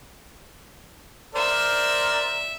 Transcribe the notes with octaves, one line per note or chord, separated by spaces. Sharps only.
A#4 C5 D5 E5